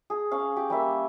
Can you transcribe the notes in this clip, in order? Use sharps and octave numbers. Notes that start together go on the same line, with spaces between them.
G#4
C#4 F5
G4
G3 A#3 E5